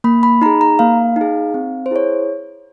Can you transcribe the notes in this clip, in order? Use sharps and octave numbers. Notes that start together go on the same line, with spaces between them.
A#3 B5
B5
D#4 G#4 A#5
A#5
A#3 F5
D#4 G#4
C4
C5
E4 G#4 C#5